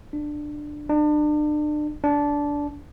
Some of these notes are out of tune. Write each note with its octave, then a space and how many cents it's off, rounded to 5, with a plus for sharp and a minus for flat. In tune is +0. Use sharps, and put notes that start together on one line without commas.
D4 +15
D4 +35
D4 -15